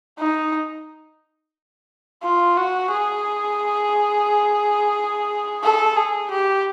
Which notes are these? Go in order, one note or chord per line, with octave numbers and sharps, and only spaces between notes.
D#4
F4
F#4
G#4
A4
G#4
G4